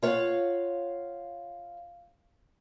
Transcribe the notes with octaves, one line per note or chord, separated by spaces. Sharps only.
F4 C#5 F5 F#5